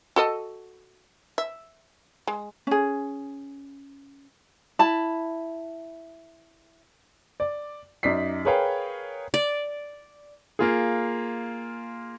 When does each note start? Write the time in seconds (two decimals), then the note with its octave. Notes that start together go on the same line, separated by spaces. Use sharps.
0.16 F#4 A4 D#5
1.38 E5
2.27 G#3
2.67 C#4 G#4
4.79 E4 A5 B5
7.40 D5
8.03 F#2 D#4 D5 B6 C7
8.45 G#4 A#4 B4 C#5 F5 G5
9.34 D5
10.59 A#3 F4 G#4